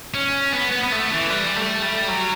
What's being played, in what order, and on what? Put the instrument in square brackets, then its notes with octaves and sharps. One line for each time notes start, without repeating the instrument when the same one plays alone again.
[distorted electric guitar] C#4
B3
B3
B3
A3
E3
G3
A3
G3
F#3